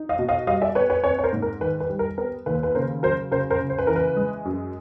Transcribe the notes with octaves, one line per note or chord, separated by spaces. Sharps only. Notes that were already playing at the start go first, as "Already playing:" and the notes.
Already playing: D#4
D#5 F5
B2
D#5 F5
G3 D#5 F5
D5 E5
B3 B4 C#5
B4 C#5
C4 B4 C#5
C#5
A#4 C5
G#2
A#4
D#3 B4
B4
G3
A#4
B3 A#4
D#2 B4
B4
C#3 A#4 C5
F#3 A#4 C5
C#3 A#4 C5
A#4 C5
C#3
C5
B4
E3 A#4
B4
G#3
F#2